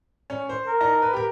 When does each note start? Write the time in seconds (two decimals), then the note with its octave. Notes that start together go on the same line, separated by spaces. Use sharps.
0.30 C#4
0.49 C5
0.67 A#4
0.81 D#4 A5 A#6
1.02 B4
1.13 G4 A#4